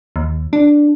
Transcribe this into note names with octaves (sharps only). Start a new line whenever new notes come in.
D#2
D4